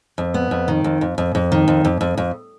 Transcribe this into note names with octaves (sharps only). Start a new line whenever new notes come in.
F2
B3
F2
D#3
F2
F2
F2
F2
D#3
F2
F2
F2
F2